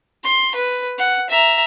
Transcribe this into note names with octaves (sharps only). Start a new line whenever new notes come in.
C6
B4
F#5
E5 A#5